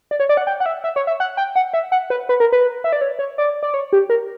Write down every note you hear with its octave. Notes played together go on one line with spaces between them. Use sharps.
D5
C#5
D5
F#5
G5
F#5
E5
E5
C#5
E5
F#5
G5
F#5
E5
F#5
B4
B4
A#4
B4
E5
D5
C#5
C#5
D5
D5
C#5
G4
A#4